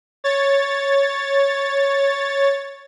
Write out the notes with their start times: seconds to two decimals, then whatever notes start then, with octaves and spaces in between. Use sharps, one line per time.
0.24 C#5 A6